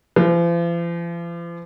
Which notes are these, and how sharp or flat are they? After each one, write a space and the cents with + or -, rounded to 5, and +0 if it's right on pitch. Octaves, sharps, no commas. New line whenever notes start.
F3 -45